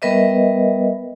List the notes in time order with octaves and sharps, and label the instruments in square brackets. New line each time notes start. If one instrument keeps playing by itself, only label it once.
[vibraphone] G3 B3 A#4 B4 D#5 E5